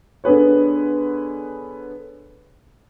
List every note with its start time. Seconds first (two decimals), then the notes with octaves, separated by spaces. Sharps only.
0.24 D3 B3 G#4 B4 C#5